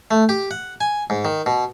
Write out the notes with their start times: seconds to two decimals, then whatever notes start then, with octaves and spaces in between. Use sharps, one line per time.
0.11 A3
0.29 G4
0.51 F#5
0.81 G#5
1.10 G#2
1.25 D#3
1.46 B2